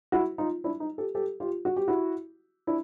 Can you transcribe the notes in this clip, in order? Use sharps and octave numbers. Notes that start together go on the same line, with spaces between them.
E4 F#4
D#4 F4
D4 E4
D#4
G4 A4
G4 A4
F4 G4
F#4
G4
E4 F#4
D4 E4